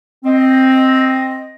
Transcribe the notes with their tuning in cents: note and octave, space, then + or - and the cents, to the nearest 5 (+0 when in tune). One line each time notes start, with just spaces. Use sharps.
C4 +5 D#5 +0